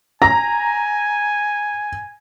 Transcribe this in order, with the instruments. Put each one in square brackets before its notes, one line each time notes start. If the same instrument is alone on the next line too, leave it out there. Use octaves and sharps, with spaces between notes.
[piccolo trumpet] G#5 [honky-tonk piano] A#5 [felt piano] A#6